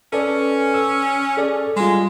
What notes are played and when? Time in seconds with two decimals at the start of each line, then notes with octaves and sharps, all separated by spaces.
0.13 C#4 A4 B4 D5
0.74 E6
1.37 G#4 A4 D5
1.76 G3 G#3 F4